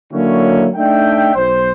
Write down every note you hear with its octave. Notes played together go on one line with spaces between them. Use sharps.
D3 F#3 A#3 C#4 E4 F#4
A3 D4 D#4 E5 G5
B1 C5